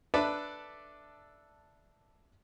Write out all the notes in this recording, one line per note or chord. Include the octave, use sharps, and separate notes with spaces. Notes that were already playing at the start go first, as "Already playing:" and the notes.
D4 A4 B4 D5 E5